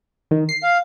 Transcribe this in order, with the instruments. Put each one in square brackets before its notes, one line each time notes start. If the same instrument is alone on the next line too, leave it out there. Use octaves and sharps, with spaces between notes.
[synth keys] D#3
C7
[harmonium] F5